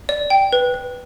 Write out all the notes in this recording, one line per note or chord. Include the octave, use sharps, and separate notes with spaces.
D5
G5
B4
B4